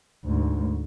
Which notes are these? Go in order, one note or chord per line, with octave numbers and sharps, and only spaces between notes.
D2 G#2